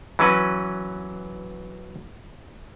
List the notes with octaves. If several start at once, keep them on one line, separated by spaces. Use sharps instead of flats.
E3 F#3 C#4 B4